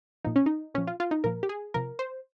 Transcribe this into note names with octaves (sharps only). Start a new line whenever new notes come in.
A#2 F3 D#4
C#4
D#4
A#2 F3 C#4
F4
F4
D#4
A#2 F3 A#4
G4
G#4
C3 F3 A#4
C5